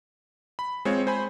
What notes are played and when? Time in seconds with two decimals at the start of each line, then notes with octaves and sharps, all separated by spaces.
0.59 B5
0.85 G#3 C4 F4 C#5
1.07 C5 G#5 B5